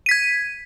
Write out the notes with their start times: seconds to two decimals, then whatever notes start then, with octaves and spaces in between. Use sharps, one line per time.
0.06 D#7
0.09 B6
0.11 G#6